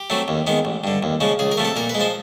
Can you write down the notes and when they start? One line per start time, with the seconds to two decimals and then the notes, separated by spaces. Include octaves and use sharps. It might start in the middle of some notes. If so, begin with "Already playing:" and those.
Already playing: G4
0.10 F#3 A3 C4
0.28 D#2
0.47 D#3 G#3 B3
0.65 A1
0.84 G2 D3
1.03 D#2
1.20 C#3 F3 G#3
1.39 C#2 G#4
1.52 A#4
1.57 C3 F3 A3
1.65 A4
1.76 A#2 A#4
1.89 B4
1.94 G#3
2.00 F3 C5